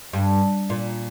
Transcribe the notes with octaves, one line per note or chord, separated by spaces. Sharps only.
G2
A#2